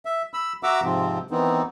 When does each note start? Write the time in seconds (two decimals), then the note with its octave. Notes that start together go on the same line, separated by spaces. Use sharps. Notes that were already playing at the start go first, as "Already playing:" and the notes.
0.05 E5
0.34 B5 E6
0.63 F#4 E5 F#5 A#5 D6 E6
0.83 G#2 C3 F3 C4
1.30 D#3 E3 B3 C4 D#4